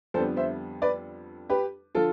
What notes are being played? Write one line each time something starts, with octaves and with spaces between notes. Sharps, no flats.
F2 D3 G3 B3 A4 C5
C5 E5
B4 D5
G4 B4
D3 F3 F4 A4